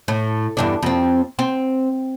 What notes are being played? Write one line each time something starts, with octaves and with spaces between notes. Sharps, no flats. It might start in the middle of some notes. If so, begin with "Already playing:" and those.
A2
E2 G2 D4
F2 C4
C4